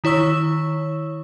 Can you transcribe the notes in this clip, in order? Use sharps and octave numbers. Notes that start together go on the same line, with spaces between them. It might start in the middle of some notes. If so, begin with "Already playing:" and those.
D#3 E4 C#5 C#6 E6